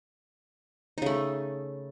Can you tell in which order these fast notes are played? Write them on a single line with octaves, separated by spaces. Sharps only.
D#4 C#3 A3